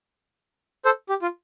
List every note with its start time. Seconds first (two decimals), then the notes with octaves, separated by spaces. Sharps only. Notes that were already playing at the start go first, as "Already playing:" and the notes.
0.85 A4 C5
1.09 G4
1.22 F4